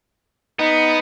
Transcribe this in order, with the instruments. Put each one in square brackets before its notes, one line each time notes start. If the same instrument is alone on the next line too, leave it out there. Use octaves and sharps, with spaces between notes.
[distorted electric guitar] B3 [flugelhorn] D#4